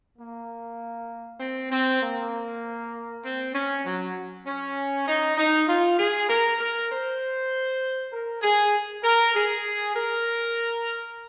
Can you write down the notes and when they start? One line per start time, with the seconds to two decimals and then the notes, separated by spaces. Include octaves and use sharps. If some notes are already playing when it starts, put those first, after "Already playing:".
0.18 A#3
1.40 C4
1.70 C4
2.01 A#3
3.23 C4
3.54 C#4
3.85 F#3
4.45 C#4
5.07 D#4
5.37 D#4
5.67 F4
5.98 G#4
6.28 A#4
6.59 A#4
6.90 C5
8.12 A#4
8.42 G#4
9.03 A#4
9.34 G#4
9.95 A#4